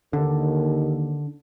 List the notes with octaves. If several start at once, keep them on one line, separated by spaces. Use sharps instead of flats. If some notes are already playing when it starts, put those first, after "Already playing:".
D#2 D3